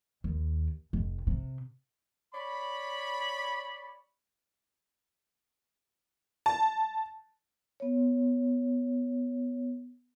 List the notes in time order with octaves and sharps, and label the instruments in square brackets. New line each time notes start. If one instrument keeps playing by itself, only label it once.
[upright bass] D#2
F1
C3
[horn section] C#5 D5 B5
[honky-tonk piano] A5
[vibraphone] B3 C#5